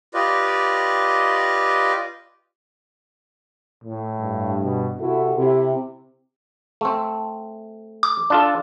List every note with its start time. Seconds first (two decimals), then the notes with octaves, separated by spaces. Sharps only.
0.14 F4 G4 B4 D5 D#5
3.84 A2
4.18 G2
4.62 B2
5.00 C3 E4 F#4 A4
5.36 C3 E4
6.81 A3 C4
8.03 D6
8.30 D4 F4 A4